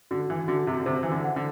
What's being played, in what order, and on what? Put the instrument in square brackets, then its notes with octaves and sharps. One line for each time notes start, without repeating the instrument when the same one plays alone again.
[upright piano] D3 [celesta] F#4
[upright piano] E3
[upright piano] D3 [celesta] F#4
[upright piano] C3
D3
[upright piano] C3 [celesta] C5
[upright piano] E3
D3
[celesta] F#5
[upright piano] D3